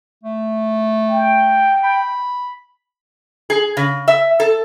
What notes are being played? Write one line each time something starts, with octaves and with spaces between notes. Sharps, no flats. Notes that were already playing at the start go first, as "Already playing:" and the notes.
A3
G5
B5
G#4
C#3
E5
A4